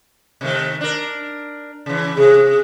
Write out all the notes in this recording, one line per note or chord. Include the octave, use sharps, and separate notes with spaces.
C3 D#3 A3
D4 A#4
C#3 E3
C3 G#4